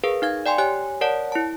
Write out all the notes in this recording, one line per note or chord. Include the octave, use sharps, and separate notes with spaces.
G#4 A#4 B4 F5
D#4 F5 G#6
D5 G5 G#5 C6
G4 C#5 G#5 F#6
A#4 C#5 D5 F#5 A5
E4 A5